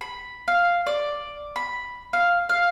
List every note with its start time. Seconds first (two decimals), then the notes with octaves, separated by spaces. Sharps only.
0.01 B5
0.48 F5
0.87 D5
1.56 B5
2.13 F5
2.49 F5